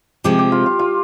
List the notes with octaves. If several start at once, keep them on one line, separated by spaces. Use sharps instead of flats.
C3 F3 G#3 G4
G4
F4
F4
F4